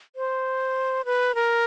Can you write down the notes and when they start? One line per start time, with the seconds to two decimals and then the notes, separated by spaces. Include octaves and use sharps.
0.16 C5
1.05 B4
1.35 A#4